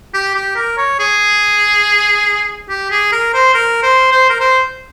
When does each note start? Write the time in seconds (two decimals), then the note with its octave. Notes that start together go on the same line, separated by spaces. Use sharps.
0.14 G4
0.35 G4
0.56 A#4
0.78 C#5
0.99 G#4
2.69 G4
2.91 G#4
3.12 A#4
3.34 C5
3.54 A#4
3.83 C5
4.12 C5
4.30 A#4
4.40 C5